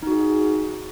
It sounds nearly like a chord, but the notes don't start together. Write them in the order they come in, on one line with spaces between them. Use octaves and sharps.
D#4 F#4 G#4